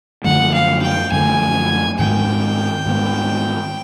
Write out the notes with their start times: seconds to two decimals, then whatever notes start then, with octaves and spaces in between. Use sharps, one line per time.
0.24 F#2 D3 F3 A3 F#5
0.54 F5
0.82 G5
1.12 F#2 D3 F3 A3 G#5
1.99 G#2 D#3 G#3 B3 G5
2.86 G#2 D#3 G#3 B3